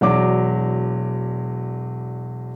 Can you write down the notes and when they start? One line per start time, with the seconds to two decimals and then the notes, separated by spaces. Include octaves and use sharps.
0.01 E1 F#3 D5 D6